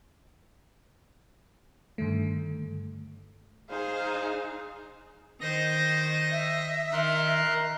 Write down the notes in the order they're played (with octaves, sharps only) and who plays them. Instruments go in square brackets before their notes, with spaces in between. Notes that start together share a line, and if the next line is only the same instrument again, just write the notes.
[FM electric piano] G2 D3 D#3 A3
[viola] D#4 [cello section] G#4 [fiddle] C5 [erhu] F5
[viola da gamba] D#3 C5 [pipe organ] D#5 A#6
[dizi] E5
[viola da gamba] D#3 [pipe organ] A#4 C6 F#6